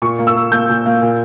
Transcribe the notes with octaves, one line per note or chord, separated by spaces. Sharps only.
A#2 C#6
A#3
E6
A#3
A#3 G6
A#2
A#3
A#2